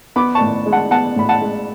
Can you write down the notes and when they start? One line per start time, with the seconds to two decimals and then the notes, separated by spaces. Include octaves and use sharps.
0.16 B3 B5 D6
0.35 A5 C#6
0.41 A2
0.66 G#3
0.72 F#5 A5
0.91 B3 F#5 A5
1.16 A2 B5
1.29 F#5 A5
1.41 G#3